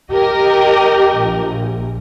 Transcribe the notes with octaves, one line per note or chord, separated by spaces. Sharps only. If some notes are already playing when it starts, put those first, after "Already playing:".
G4 A#4 D#5
A#1